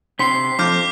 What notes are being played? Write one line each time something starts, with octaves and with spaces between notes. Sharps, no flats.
C3 C6 B6 C7
F2 D6 F6 G6